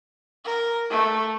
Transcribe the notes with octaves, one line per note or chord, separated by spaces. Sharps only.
A#4
A3